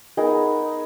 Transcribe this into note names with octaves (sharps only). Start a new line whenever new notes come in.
B3 D#4 G#4 A#4